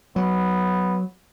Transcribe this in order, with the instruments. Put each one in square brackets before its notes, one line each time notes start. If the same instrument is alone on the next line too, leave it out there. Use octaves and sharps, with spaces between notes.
[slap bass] F#3 [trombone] B3